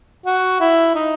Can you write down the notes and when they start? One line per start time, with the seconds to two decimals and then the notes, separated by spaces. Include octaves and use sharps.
0.26 F#4
0.61 E4
0.95 D#4